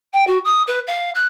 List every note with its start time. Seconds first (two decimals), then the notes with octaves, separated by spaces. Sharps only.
0.13 G5
0.27 F#4
0.44 D#6
0.67 B4
0.87 F5
1.14 F#6